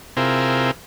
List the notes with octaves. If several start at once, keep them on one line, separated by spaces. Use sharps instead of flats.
C3 C4 E4 F4 G#4 A#4